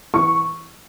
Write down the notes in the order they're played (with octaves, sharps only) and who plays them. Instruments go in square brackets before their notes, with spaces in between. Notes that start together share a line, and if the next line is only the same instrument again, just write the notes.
[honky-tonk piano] E3 C#6